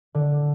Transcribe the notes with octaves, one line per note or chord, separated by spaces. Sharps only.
D3